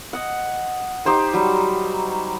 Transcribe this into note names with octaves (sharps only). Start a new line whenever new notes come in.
D#5 F#5
D#4 G4 C5 G5
F#3 G3